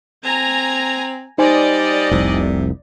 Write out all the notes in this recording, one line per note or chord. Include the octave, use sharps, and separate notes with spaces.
C4 G#5 A#5
G3 D#4 C5 D5 D#5 G#5
F1 C2 C3